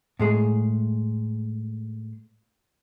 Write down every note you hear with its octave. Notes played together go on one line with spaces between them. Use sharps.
A2 G#3 G#4